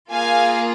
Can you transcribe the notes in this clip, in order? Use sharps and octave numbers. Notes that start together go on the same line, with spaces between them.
A#3 F4 G#4 F5 G#5